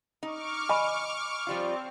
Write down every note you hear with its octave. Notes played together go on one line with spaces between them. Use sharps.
D#4 C#6 D6 F6
D#5 G#5 B5
F3 G3 C4 F4